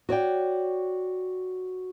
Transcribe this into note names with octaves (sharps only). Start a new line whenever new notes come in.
F#4 C#5 D5 G5